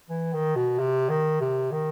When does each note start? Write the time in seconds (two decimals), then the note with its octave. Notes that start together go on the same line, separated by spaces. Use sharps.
0.10 E3
0.33 D#3
0.56 B2
0.79 C3
1.09 D#3
1.41 C3
1.72 D#3